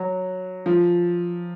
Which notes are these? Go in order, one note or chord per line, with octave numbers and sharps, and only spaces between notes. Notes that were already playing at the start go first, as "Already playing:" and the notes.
Already playing: F#3
F3